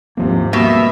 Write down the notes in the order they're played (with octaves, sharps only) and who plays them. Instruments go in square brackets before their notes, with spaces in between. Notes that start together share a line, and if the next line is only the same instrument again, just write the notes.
[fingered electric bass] D#2 F3 A#3 [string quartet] G#2 C3
[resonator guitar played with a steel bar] B2 [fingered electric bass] G3 A#3 [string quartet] E5